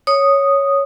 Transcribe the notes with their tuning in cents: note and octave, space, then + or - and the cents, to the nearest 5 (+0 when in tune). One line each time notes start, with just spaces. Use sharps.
C#5 +0 D#6 -5